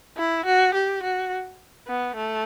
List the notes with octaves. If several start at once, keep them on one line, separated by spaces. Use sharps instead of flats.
E4
F#4
G4
F#4
B3
A3